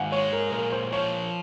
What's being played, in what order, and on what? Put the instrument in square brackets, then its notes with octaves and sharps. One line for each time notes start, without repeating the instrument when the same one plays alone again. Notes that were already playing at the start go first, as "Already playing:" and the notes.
Already playing: [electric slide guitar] G#2 D#3 [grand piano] F5 F#5 G#5
[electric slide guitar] G#3 [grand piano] C#5
[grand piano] A#4
[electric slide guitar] A#2 [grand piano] A#4
[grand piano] C5
[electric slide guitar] F3 [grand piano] C#5